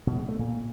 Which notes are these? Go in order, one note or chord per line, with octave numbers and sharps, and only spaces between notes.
B2
G#3
A3
A#2